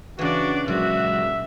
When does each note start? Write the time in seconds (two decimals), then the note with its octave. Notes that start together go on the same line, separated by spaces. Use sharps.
0.19 C#3 E3 D4 F#4 D5
0.68 A#2 C#3 F#3 G#3 F#4 E5